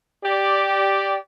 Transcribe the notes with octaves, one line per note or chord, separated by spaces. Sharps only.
G4 D5